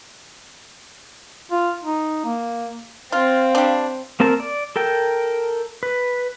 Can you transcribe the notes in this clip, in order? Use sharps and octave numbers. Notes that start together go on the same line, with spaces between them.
F4
D#4
A#3
C4 F4 F5
G3 D4
A#3 C4 A#4 A5
D5
A4 A#4 G5
B4